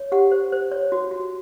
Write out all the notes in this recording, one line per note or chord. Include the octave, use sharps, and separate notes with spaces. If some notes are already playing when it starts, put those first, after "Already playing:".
Already playing: C#5
G4 F#5
C5
C5
C#5
F#4
F#4